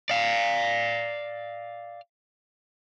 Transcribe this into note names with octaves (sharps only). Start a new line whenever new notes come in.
D5 F5